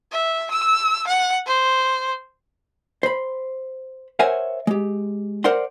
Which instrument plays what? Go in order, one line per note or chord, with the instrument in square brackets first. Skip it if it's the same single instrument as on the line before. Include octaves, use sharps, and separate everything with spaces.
[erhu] E5
E6
F#5
C5
[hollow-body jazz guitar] C5 B5
A#4 C5 C#5 E5 F#5 G#5
G#3 G4
A#4 C5 D5 F#5 C6